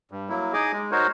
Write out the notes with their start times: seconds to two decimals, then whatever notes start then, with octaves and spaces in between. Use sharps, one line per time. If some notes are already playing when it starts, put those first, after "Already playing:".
0.11 G2
0.29 F#3 A#3 E4
0.53 D#4 G#4 D#5 G#5 D6
0.73 G#3
0.91 D#4 F#4 A#4 C5 C#5